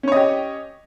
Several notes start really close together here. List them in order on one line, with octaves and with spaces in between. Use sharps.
C#4 C#5 D#5 G4